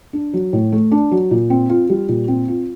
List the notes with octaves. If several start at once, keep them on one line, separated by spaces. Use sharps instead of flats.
D4
F#3
A2
A3
D4
F#3
A#2
C4
F4
G3
A#2
C4
F4